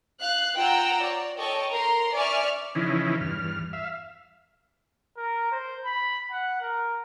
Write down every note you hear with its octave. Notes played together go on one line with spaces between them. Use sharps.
F5 F#6
F4 F#5 G5 A#5 E6
C#5 D5
A4 C#5 D#5 G5 C#6
A#4 A#5 C6
D5 E5 G#5 C#6 F6
C#3 E3 F3 C#4 D#4 E4
E2 G2 F6
E5 F5
A#4
C5
B5
F#5
A#4